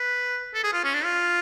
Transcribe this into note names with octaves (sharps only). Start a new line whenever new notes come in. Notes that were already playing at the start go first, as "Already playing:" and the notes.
Already playing: B4
A4
G#4
F4
C#4
D4
F4